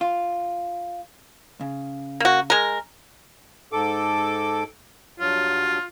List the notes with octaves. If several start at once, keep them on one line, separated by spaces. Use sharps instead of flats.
F4
C#3
A#3 F#4
G#3 A#4
G#2 A4 D6
G2 F#3 F4